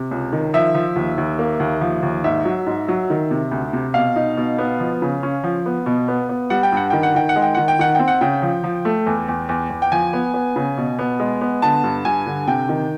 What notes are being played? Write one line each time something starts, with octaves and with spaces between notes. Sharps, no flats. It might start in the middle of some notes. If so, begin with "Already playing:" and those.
Already playing: C3
C#2
D#3
F3 E5
F3
D#2
D#2
A#3
D#2
F3
D#2
G#2 E5
F#3
G#2
F#3
D#3
C3
D2
C3
B2 F5
D#4
B2
B3
F3
C#3
C#4
F3
B3
B2
B3
B3
G3 F#5
G5
G2 F#5
D#3 G5
F#5
D#3 G5
F#5
G#3
G5
D#3 F#5
G5
D#3 F#5
C4 G5
F#5
C#3 G5
F3
F3
A3
E2
E2
E2
E2
G5
F3 G#5
B3
B3
C#3
B2
B3
G#3
B3
D3 A5
G2
G2 G#5
D3
C3 G5
D#3